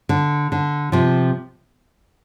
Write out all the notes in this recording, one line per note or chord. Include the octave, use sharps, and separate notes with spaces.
D3
D3
C3 F3